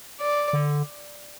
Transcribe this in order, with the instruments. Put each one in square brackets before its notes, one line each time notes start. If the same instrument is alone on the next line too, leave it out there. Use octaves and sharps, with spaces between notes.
[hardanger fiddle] D5
[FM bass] D3